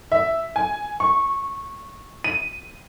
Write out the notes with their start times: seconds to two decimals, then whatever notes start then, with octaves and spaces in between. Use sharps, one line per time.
0.12 E5
0.56 G#5
1.00 C#6
2.24 D#7